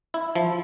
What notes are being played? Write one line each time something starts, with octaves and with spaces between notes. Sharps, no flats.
E4
F3